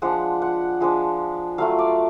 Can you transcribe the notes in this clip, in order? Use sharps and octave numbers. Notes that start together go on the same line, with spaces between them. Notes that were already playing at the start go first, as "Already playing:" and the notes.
F3 G#3 D4 F#5
F#5
F3 G#3 D4
F#3 A3 F4 F5
D5